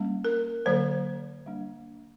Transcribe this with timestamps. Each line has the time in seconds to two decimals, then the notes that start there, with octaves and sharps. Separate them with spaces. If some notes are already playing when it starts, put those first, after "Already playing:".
Already playing: G3 A#3 C#4
0.25 A#4
0.66 D3 F#3 A#3 C5
1.46 G3 A#3 D4